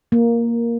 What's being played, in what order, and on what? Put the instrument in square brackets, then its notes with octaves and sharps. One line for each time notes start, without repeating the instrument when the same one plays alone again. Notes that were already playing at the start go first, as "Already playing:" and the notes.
[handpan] A#3